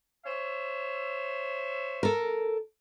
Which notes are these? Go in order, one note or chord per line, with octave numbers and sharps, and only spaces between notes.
C5 C#5 E5
A4 A#4